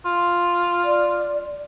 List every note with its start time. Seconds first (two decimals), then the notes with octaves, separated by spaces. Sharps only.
0.05 F4
0.84 D5